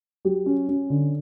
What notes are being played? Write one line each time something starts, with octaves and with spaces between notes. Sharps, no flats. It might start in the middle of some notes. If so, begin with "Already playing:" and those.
F#3 G4
C#4
C#4
D3